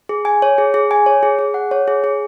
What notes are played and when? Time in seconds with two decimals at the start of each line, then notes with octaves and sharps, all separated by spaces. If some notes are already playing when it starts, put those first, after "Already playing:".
0.09 G#4
0.25 G#5
0.42 C#5
0.58 G#4
0.74 G#4
0.91 G#5
1.06 C#5
1.23 G#4
1.39 G#4
1.54 F#5
1.71 C#5
1.88 G#4
2.04 G#4